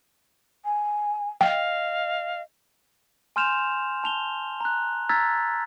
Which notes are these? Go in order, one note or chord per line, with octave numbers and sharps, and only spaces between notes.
G#5
D#5 F5 G5
G#5 C6 F6 G6 E7 F7
A5 F7 G7
A#5 F#6
A#5 E6 F6 G#6 A6 B6